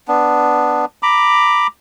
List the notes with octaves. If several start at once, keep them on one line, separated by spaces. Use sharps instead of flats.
B3 D4
A#5 B5 D6